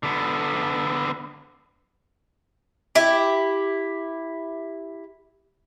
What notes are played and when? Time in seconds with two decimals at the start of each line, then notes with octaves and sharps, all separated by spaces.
0.03 D3 B3
2.95 E4 G4